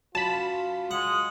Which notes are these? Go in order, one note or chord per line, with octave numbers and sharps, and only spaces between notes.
F#2 F4 A5 B5
G#3 F#5